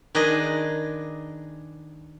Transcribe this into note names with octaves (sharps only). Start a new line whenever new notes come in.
D#3 D4 D#4 G#4 B4 D#5